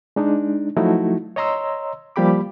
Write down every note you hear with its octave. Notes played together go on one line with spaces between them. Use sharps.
G#3 D4 D#4
F3 F#3 A3 D#4 E4 F#4
C#5 D#5 A#5 C6 E6
F3 G3 A#3 G4 B5 D6